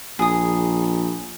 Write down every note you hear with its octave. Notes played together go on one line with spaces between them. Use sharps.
A#1 G#4 D#6